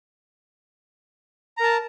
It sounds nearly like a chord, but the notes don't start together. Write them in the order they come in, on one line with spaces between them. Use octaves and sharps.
A#5 A#4 A5